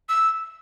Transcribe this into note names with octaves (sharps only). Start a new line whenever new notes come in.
E6